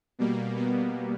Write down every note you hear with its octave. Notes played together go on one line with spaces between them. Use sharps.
B2 G3 A#3
B3